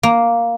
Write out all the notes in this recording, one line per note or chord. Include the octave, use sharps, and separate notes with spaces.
A#3